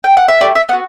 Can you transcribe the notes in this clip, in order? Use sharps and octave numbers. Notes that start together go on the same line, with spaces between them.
G5
F#5
E5
A3 E4 G4 D5
E5
B3 D4 F#4 F#5